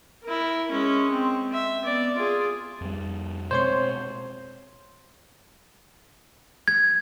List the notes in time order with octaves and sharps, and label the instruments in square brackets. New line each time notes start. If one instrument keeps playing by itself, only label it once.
[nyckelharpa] E4 A#4
G#3 C#4
C4
E5
B3 D5
F4 G#4
[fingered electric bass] F2 G3
[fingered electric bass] B2 G#3 C4 [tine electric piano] C5 C#5 C6
[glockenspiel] G#6